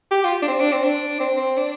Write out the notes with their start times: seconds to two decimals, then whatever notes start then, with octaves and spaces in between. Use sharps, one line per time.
0.11 G4
0.24 F4
0.42 D4
0.48 C4
0.60 D4
0.72 C4
0.83 D4
1.20 C4
1.36 C4
1.57 D4